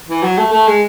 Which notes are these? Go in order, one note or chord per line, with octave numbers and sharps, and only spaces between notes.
E3
F#3
A3
A3
G#3